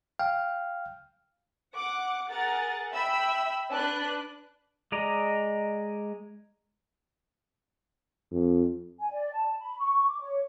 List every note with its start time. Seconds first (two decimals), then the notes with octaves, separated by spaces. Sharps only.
0.19 F5 G5 F6
1.74 F#5 D6
2.29 G#4 A#4 F#5 A6
2.91 E5 G5 B5 E6
3.72 D4 B4 F#6
4.92 G#3 D5 D#5 A#5
8.31 F2
9.00 G#5
9.12 D5
9.33 A5
9.60 B5
9.78 C#6
10.07 D6
10.21 C#5